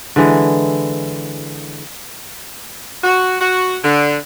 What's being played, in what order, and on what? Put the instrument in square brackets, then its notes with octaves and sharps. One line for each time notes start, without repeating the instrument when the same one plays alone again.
[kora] D3 E3 G#3
[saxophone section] F#4
F#4
D3